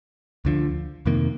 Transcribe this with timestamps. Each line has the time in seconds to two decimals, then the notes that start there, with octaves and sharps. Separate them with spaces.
0.45 D2 D3 F3
1.06 F2 C3 D#3 A#3